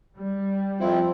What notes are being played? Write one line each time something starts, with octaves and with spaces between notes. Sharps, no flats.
G3
F2 F3 C4 E4